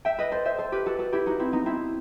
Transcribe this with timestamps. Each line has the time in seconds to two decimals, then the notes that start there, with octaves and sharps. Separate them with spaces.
0.05 E5 G5
0.18 B4 D#5
0.31 A4 C5
0.45 C5 E5
0.58 A4 C5
0.72 G4 B4
0.86 F#4 A4
0.99 F#4 A4
1.12 E4 G4
1.26 D#4 F#4
1.39 C4 E4
1.52 B3 D#4
1.66 C4 E4